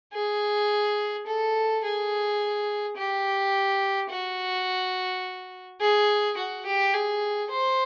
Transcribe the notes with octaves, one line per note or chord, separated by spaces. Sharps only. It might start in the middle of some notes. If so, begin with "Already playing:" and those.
G#4
A4
G#4
G4
F#4
G#4
F#4
G4
G#4
C5